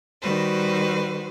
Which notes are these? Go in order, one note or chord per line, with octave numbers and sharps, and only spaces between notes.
D#3 G3 F#4 B4 C5